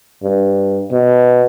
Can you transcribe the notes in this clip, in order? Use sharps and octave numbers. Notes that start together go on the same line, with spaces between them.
G2
B2